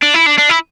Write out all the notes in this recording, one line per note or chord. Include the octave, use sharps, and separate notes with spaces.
D4
E4
D4
D4
E4